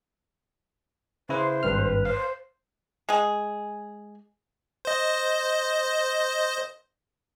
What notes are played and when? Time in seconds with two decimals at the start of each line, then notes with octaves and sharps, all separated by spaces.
1.29 C#3 E4 B4 C5
1.63 G#1 G2 B4 F6
2.05 C5 F5
3.09 G#3 G#4
4.85 C5 D#5